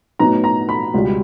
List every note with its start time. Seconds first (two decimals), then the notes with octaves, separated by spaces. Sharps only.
0.19 A2 F#3 B3 D#4 A#5
0.44 A#5
0.69 B5
0.94 C#2 B2 G3